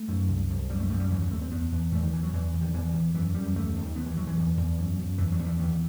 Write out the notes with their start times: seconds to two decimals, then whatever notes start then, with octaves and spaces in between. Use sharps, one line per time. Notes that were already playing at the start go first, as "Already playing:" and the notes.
Already playing: A3
0.08 F#2
0.29 C2
0.50 C2
0.69 F#2 G3
0.80 A3
0.90 F#2 A3
1.00 G3
1.11 D#2 E3
1.21 F#3
1.31 D#2 A3
1.42 C4
1.52 E2 B3
1.72 E2
1.92 E2 A3
2.02 D#3
2.13 E2 E3
2.23 F#3
2.33 E2 E3
2.53 E2
2.62 D#3
2.73 E2 E3
2.94 E2 E3
3.14 F#2 E3
3.34 F#2 G3
3.56 D#2 A3
3.76 D#2
3.96 D#2 B3
4.06 E3
4.16 D#2 F#3
4.27 E3
4.37 E2
4.57 E2
4.78 F#2
4.99 F#2
5.18 E2 E3
5.32 F#3
5.39 E2 D#3
5.46 E3
5.59 D#2 E3